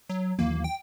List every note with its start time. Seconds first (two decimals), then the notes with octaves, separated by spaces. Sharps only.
0.09 F#3
0.39 D#2 E3 F#3 A#3
0.64 G5